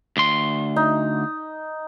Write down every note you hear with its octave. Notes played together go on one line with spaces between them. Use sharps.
D2 C6
D#4